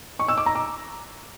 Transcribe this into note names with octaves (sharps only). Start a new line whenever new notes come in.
C#6
E6
D6
A#5
D6